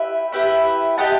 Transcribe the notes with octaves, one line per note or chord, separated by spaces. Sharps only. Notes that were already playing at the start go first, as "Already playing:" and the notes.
Already playing: E4 G4 B4 E5
E4 G4 B4 E5
G4 D#5 F#5 A5